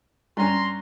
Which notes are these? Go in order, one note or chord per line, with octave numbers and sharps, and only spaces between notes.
G2 C#4 A#5 C6